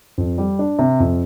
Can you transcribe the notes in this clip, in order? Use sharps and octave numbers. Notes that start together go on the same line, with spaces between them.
F2
G3
D4
C3
F2